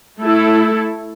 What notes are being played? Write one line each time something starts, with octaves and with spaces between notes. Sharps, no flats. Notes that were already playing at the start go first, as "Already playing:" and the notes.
A3 E4 A4